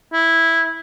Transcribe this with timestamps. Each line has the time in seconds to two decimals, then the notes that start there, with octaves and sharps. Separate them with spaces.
0.13 E4